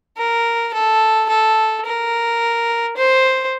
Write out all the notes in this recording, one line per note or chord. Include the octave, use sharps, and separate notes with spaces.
A#4
A4
A4
A#4
C5